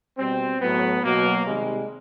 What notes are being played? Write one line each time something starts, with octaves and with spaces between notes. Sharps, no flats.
B2 G3 C4
A2 F#3 B3
B2 F#3 A#3
C3 D#3 G3 G#3